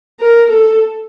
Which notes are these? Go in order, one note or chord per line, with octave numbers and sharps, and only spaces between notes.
A#4
A4